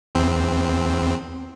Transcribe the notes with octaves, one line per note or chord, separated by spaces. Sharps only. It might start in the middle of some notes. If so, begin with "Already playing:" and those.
E2 C4